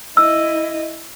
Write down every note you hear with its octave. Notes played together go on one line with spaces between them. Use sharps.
E4 D#5 E6